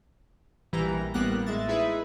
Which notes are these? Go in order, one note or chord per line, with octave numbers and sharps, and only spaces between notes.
A#1 E3 G3 A#5
A1 G3 A#3 B3 F#6 A#6
A1 G#3 E5 A6
D#4 E4 G#4 B4 E5